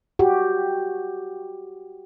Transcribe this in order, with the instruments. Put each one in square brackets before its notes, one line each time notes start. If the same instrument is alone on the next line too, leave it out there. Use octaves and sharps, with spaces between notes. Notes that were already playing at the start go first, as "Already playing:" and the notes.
[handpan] F#4 G4